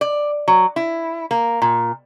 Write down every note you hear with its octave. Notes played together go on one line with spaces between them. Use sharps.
D5
F#3
E4
A#3
A#2